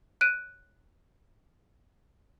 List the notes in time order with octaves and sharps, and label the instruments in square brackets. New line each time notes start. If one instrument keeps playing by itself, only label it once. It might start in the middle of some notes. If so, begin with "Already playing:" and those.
[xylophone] F#6 D7 D#7